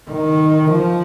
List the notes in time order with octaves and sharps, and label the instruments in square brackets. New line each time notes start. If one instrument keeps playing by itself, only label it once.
[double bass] D#3
F3